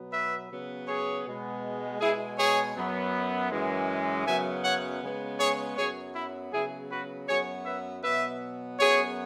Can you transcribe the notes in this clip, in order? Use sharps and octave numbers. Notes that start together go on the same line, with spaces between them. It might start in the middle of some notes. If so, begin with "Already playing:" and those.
Already playing: B2 F#3 B3
B4 E5
C#3 F#3 B3
G#4 C#5
B2 G#3 B3
B2 G#3 B3 E4 G#4
G#4 C#5
F#2 F#3 B3
F#2 E3 G#3
F#2 C#3 F#3 B3 E5 G#5
C#5 F#5
C#3 G#3 B3
G#4 C#5
F#2 F#3 B3 G#4 C#5
E4
C#3 F#3 B3 E4 G#4
F#4 B4
F#2 F#3 B3 G#4 C#5
B4 E5
B2 F#3 B3 B4 E5
F#2 F#3 B3 G#4 C#5